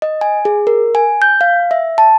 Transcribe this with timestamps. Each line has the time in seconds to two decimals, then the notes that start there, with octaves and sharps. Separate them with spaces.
0.02 D#5
0.21 G#5
0.45 G#4
0.67 A#4
0.95 G#5
1.22 G6
1.41 F5
1.71 E5
1.98 A5